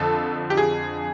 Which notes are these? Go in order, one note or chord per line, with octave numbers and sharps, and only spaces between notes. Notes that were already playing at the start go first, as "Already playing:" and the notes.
Already playing: F2 D3 F3 A4
G4
G#4